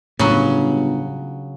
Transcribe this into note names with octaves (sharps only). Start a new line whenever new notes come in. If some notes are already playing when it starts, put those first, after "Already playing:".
G1 A2 C#3 F#3